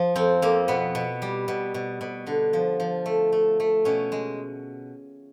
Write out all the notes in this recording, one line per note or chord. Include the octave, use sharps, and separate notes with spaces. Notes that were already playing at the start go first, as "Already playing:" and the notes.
Already playing: F3
F2 C4
F2 A#3
B2 B3
B2
G3
B2
B2
B2
D3
F3
F3
A3
A3
A3
B2 C#4
G#3